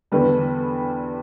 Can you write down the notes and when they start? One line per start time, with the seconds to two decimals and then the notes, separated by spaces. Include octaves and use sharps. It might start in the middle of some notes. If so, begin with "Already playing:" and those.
0.12 E2 D3 G3 B4